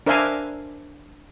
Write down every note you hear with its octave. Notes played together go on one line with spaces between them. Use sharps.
D4 A#4 C5 E5 F5 G#5